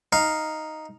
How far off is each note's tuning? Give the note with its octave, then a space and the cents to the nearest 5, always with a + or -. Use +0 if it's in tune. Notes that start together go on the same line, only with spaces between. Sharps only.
D#4 +0 F5 +0